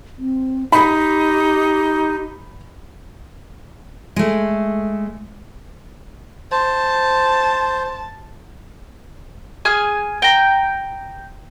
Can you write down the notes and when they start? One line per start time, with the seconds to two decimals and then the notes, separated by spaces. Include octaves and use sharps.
0.18 C4
0.72 D#4 G4 B5
4.16 G#3 A3
6.52 C5 A5
9.65 G#4 G#5 F6
10.22 G5 A#5